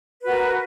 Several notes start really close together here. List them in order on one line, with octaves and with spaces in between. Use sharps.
B4 F#4 A#4